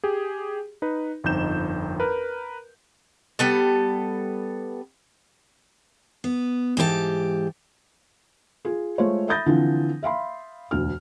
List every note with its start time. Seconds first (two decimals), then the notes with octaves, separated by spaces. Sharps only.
0.04 G4 G#4
0.82 D#4 B4
1.24 G1 F2 C4 D#4 G6 E7
2.00 A#4 B4
3.39 G3 B3 A4
6.24 B3
6.77 G#2 E3 G4 A#4 A5
8.65 F4 G#4
8.98 G#3 A3 F4 C5 C#5
9.28 E5 B5 D#6 G6 A6 A#6
9.46 D3 E3 F3 C4
10.03 E5 F5 B5 C6
10.71 E1 D2 F6